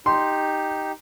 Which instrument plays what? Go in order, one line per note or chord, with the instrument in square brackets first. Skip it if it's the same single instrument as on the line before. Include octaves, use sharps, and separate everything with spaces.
[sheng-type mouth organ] D#4 G4 [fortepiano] C6